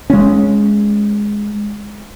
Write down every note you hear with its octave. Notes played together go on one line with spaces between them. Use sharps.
G#3 C#4